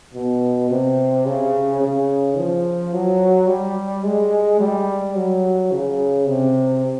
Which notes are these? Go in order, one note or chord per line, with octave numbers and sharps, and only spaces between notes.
B2
C3
C#3
C#3
F3
F#3
G3
G#3
G3
F#3
C#3
C3